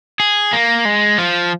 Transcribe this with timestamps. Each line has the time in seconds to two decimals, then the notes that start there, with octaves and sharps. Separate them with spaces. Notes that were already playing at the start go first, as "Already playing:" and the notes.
0.20 G#4
0.53 A#3
0.85 G#3
1.18 F3